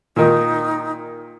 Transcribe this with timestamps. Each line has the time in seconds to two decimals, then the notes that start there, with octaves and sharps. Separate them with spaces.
0.16 A#2 D#3 D#4